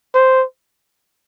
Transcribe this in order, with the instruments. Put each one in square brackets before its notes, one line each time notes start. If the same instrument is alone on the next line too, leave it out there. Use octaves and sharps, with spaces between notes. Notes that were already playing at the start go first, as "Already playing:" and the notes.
[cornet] C5